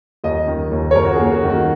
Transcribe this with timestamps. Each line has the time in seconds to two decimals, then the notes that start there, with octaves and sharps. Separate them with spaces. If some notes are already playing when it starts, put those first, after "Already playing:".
0.24 D#2 D#5
0.47 D#3
0.71 D#2
0.91 C#5
0.95 D#2 A#4
1.05 F#4
1.14 G#4
1.19 A#3
1.32 F#4
1.43 D#3
1.50 F#4